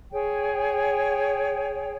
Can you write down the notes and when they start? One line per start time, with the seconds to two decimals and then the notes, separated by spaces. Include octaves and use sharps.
0.12 G#4 C#5 G5